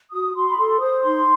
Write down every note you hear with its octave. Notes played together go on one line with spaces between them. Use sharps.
F#4 D#6
F#4 C6
B5
A4 C6
C5 D#6
D#4 C6